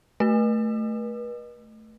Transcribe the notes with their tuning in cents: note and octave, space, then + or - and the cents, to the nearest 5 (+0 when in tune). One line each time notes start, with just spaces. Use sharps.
A3 +0 B4 -40